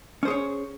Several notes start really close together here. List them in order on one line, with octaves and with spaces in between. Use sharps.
C#4 C5 G#4 C#5